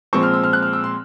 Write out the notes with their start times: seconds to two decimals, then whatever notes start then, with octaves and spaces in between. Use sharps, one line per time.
0.13 A#2 F3 G#3 C4 C#6
0.23 F6
0.34 E6
0.44 F6
0.53 F#6
0.63 F6
0.73 E6
0.84 C6